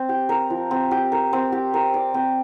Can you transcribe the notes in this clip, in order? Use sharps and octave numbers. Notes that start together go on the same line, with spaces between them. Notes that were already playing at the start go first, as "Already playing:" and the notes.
Already playing: C4
G4
A#4
F3
C4
G4
A#4
C4
G4
A#4
D5
C4